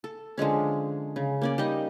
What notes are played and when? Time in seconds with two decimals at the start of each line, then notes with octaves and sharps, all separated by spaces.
0.04 A4
0.38 D3 F3 G#3 C#4
1.16 C#3
1.41 A#3 C#4 D5
1.58 G3 D#4 D#5